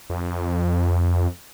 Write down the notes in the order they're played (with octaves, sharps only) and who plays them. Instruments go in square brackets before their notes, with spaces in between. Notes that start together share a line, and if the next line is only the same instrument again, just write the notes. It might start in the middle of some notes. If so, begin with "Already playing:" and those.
[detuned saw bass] F2